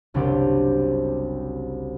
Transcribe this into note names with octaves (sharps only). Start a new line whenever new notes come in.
F#1 C2 C3 D4 G4 C5